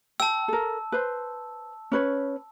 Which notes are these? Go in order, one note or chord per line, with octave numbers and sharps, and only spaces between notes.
G5 A5 E6
A4 A#4
B4 C5
C#4 B4 C#5